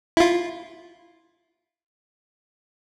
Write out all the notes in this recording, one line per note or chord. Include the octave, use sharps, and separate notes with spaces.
E4 F4